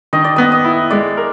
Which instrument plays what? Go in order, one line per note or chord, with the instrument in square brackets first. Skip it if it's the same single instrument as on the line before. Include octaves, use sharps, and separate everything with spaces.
[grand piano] D#3 [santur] D#5
[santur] D5
[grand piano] B3 [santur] D#5
[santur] D#5
[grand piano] E4
[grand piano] G#3 [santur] D5
[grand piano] A#4